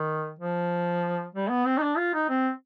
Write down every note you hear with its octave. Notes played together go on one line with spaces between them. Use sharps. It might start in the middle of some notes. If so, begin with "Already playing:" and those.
Already playing: D#3
F3
G3
B3
C4
D#4
D4
F4
D#4
C4